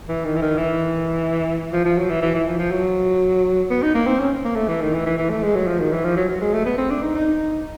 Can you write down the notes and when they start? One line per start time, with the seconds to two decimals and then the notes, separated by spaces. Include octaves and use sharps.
0.08 E3
0.25 D#3
0.36 E3
0.42 D#3
0.57 E3
1.72 F3
1.85 F3
1.98 F#3
2.09 E3
2.22 E3
2.35 E3
2.46 F3
2.59 F3
2.71 F#3
3.70 B3
3.82 D#4
3.94 A#3
4.07 C4
4.19 C#4
4.44 A#3
4.55 A3
4.68 E3
4.81 D#3
4.93 E3
5.06 E3
5.17 E3
5.30 A3
5.42 G#3
5.54 F#3
5.67 F3
5.79 D#3
5.92 E3
6.04 F3
6.16 F#3
6.29 F#3
6.41 G#3
6.53 A3
6.65 B3
6.78 C4
6.90 D4
7.02 D#4
7.15 D#4